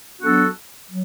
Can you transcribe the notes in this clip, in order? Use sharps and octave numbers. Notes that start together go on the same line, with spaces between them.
F#3 B3 D4 F#4 A4
F#3